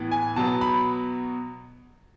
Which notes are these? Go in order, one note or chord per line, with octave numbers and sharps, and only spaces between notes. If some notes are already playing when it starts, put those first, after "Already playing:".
Already playing: A2 E3 B3
G#5
B2 F#3 B3 A5
B5